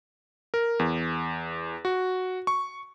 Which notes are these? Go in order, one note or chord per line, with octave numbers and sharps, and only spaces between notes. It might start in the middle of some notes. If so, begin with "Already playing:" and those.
A#4
E2
F#4
C#6